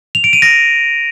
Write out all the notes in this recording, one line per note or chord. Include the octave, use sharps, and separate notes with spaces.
F7
D7
D#7
A#6